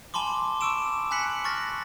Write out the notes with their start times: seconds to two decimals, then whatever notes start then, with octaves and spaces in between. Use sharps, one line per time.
0.14 G#5 A5 B5 C6 D6
0.61 C#6 D6 E6 D7 E7
1.11 G#5 B5 F#6 B6 C#7 F#7
1.44 C#6 F6 A6 A#6